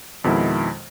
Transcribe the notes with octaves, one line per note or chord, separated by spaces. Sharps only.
F2 B2 D#3 G#3 E4